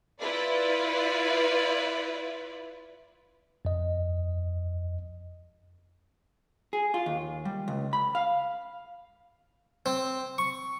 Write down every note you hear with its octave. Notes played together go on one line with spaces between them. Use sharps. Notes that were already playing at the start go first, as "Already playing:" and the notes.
E4 F4 B4 D5
F2 D#5
G#4
F4
D#2
G3
C#2
B5
F5
C4
C#6